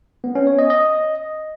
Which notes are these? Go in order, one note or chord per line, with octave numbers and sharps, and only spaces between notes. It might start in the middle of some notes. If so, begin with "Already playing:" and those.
B3
C#4
C#5
D#5
D#5